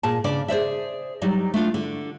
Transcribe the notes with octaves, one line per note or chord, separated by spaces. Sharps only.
A#2 G#4 A5
C#3 D4 D5
G#4 C5 D5 E5
F#3 G3 D#4 D5
A3 D4 F4
D3